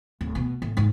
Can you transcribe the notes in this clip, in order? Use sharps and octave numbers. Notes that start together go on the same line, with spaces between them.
D1
B2
A2
G#2 F4